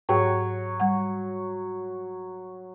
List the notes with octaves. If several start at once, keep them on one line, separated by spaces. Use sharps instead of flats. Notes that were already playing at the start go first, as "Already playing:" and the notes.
G#2 F#3 G#4 C#5 G5
G3 F#5